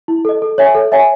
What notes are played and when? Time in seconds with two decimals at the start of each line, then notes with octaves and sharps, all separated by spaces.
0.08 E4
0.25 A4 D#5
0.42 A4
0.58 C#5 E5 G#5
0.75 A4
0.92 C#5 E5 G#5